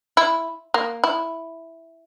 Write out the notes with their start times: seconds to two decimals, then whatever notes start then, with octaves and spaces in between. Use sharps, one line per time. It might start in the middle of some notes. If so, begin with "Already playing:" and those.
0.17 E4
0.74 A#3
1.04 E4